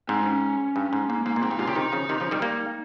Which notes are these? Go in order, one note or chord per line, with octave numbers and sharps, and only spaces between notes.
G#2 C4
D#4
C#4
G2
G#2
G#2 A#3
G#2 A#3
A#2
G#2 C4
G2 D#4
G#2 C3 F4
A#2 C#3 G4
C3 D#3 D#4
C#3 F3
C3 D#3
C#3 F3
D#3 G3
G3 A#3